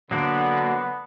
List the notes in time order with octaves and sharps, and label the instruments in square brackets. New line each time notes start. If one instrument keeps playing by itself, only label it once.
[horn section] D3 [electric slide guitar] F#3 A#3 D4 [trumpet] B3